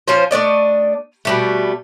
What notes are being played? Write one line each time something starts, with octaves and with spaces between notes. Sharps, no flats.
F3 C#4 F4 C5
A3 D4 D5 D#5
B2 G3 A3